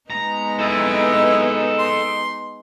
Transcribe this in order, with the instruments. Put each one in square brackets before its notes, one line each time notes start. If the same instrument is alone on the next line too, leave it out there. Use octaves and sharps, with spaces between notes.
[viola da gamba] G#3 B3 D#4 [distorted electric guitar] A#5
[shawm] E4 [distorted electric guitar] A4 D#5
[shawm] C6